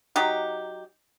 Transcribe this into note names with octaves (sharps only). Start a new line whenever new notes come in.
F#3 D#4 G4